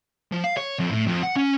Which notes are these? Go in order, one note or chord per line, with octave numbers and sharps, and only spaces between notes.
F3
F5
C#5
F2
A2
F2
F#5
C#4